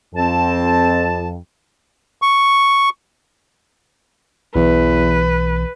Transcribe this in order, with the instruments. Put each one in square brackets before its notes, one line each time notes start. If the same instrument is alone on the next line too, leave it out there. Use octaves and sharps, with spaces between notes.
[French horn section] F2 [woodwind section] C4 A5
[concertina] C#6
[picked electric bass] B1 E3 [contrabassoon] E2 [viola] B4